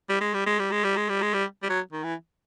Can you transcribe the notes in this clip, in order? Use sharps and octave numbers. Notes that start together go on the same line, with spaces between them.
G3
G#3
G3
G#3
G3
G#3
G3
G#3
G3
G#3
G3
G3
F#3
D#3
E3